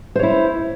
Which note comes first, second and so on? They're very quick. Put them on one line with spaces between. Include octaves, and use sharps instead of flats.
C5 C#5 E4